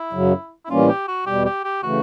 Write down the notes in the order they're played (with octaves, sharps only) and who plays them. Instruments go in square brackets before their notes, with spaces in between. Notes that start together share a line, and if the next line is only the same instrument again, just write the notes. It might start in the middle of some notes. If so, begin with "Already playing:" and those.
Already playing: [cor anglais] E4
[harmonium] F#2 C#3 F#3
[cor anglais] E4
[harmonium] A2 E3 G3 A#3 C#4 [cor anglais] F4
[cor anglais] G4
F#4
[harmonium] E2 B2 G3 [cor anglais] G4
[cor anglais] G4
G4
[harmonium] C#3 E3 A3 [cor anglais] F#4